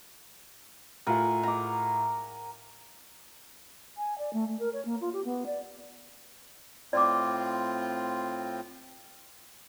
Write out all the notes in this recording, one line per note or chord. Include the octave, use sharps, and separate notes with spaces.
A2 F4 A#4 F#5 G#5
A#5 D6
G#5
D5
A3
A3
A#4
C#5
A#3
F4
G4
B3
D5
A2 C4 F4 D5 D6